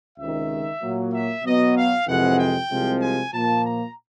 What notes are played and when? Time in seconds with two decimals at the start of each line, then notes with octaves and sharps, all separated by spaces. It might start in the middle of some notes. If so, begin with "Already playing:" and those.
0.18 C#2 C3 D#3 E5
0.81 A#2 F#3 A#3
1.13 E5
1.44 B2 F#3 B3 D#5
1.76 F5
2.07 F2 C3 E3 G#3 F#5
2.39 G5
2.70 C2 C3 F3 G#3
3.02 G#5
3.33 A#2 F3 A#3 A5
3.65 A#5